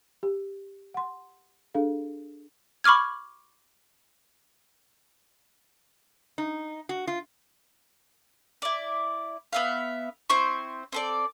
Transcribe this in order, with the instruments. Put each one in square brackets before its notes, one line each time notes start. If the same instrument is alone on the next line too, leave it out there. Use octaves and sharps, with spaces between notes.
[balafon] G4
F#5 C6
D4 G#4 A4 F5
[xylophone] B5 C#6 D6 F6 G#6
[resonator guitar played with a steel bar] D#4
F#4
F4
[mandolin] E4 D5
B3 E5 F5
C4 E4 C5 C#6
C4 A4 D5